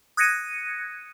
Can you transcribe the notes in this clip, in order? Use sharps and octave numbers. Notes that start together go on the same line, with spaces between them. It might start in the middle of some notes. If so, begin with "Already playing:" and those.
D#6 F#6 G#6 A#6 C#7 D#7